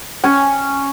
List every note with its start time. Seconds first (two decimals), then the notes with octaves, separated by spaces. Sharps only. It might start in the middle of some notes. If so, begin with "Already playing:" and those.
0.24 C#4 G#5